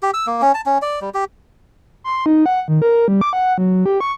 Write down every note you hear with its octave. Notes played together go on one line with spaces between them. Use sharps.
G4
E6
A#3
C#4
A5
C#4
D5
G3
G4
C6
D#4
F#5
D#3
A#4
G3
D6
F#5
F#3
G4
C#6